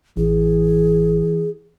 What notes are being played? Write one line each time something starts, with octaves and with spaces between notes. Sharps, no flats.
A1 E3 G#4